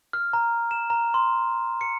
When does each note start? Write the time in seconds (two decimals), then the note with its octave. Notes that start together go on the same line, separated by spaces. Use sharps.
0.13 F6
0.33 A#5
0.71 E7
0.90 A#5
1.14 C6
1.81 C#7